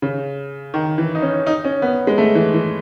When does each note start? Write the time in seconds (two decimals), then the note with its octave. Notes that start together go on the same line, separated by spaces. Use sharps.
0.02 C#3
0.74 D#3
0.98 E3
1.15 D#4
1.22 C#4
1.46 D#4
1.65 C#4
1.82 B3
2.07 G#3
2.18 A3
2.35 E3
2.54 E3